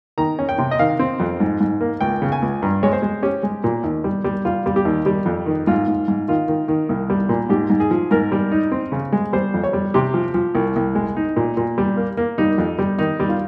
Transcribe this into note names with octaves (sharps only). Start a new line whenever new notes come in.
D#3 A#5
C#4
G5
C3
D#5
D#3 F5
C4
F2
G#2
G#2
A#3
C#2 G5
C#3
G#5
C#2
G2 A#5
G#3 C#5
C5
G#3
C#4 G4
G#3
A#2
D#2
G3
G3
G3 F4
G3
G4
D#2
G3 G4
F2
D#3
G#2 F4
G#2
G#2
D#3 F4
D#3
D#3
C2
G3
A#2
G#2 G4
G#2
G#4
F3
G#2 A#4
G3
D#4
C4
C#3
G#3
G3 C5
F2
C#5
G3
C3 G4
F3
F3
C2
C2
G#3
D#4
A#2
A#2
G3
A#3
A#3
G3 D#4
F2
G3
D#3 D#4
G3
F4